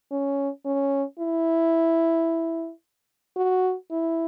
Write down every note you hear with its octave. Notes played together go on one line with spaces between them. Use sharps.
C#4
C#4
E4
F#4
E4